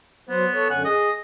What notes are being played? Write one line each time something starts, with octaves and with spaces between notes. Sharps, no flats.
F#3 B3 C5
A4 C#5
F#2 D3 F#5 G#5
G#4 D#5